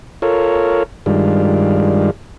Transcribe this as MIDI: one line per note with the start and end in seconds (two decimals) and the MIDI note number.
0.22 0.83 65
0.22 0.83 69
0.22 0.83 70
0.22 0.83 73
1.06 2.10 43
1.06 2.10 51
1.06 2.10 55
1.06 2.10 56
1.06 2.10 62
1.06 2.10 65